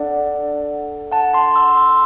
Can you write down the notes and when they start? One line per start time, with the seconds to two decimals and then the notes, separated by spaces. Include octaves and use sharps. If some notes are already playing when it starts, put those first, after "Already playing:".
Already playing: D4 A4 D5 F#5
1.12 F#5 A5
1.34 A5 C6
1.56 C6 E6
1.77 C6 E6